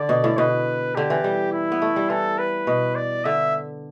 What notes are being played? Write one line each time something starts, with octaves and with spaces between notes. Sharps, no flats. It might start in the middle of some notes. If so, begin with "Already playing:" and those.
Already playing: D3 D5
B2
A2
B2 B4
D3 G4
E3
G3
E4
B3
A3
G3
E3 A4
B4
B2
D5
D3 E5